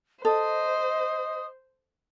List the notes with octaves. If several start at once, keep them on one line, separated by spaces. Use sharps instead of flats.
A4 C5 D#5 D#6